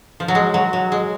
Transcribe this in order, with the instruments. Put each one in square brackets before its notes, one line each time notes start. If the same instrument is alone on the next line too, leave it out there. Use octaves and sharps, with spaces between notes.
[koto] F3
F#3
G#3
F#3
F#3
G#3